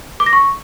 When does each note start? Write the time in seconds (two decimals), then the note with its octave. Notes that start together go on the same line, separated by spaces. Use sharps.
0.20 D6
0.26 A#6
0.33 C#6